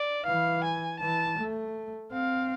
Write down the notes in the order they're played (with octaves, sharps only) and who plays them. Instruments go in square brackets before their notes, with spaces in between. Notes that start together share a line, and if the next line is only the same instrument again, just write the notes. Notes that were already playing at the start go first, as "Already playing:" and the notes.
Already playing: [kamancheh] D5
[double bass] E3 [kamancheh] F5
[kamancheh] G#5
[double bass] E3 [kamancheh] A5
[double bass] A3
[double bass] C4 [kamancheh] F5